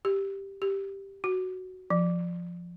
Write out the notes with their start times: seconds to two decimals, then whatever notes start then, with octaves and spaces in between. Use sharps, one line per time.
0.05 G4
0.62 G4
1.24 F#4
1.90 F3